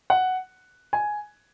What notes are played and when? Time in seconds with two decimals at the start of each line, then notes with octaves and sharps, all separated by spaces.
0.10 F#5
0.93 G#5